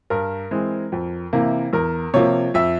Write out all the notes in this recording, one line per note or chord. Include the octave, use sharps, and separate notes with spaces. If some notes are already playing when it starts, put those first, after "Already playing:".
G2 A#4
E3 G#3 C4
F2
C3 E3 A#3
E2 A#4
C3 F3 A#3 C#5
F2 E5